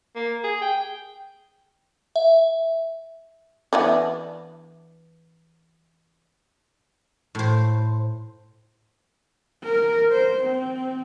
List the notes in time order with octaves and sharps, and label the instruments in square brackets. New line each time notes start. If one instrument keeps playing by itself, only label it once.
[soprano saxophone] A#3
G#4
G5
[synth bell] E5
[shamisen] E3 B3 D4
[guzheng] A2 C5
[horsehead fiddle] A#4
C5
C4